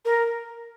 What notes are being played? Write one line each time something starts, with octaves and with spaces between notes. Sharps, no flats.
A#4